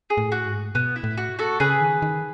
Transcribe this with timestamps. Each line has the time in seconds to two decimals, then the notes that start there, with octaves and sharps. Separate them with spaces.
0.10 G#4
0.17 A2
0.32 F#4
0.46 G#2
0.75 B2 B3
0.96 E4
1.04 A2
1.17 F#4
1.39 F#4 A4
1.60 C#3 G#4 B4
1.81 D#3
2.02 D#3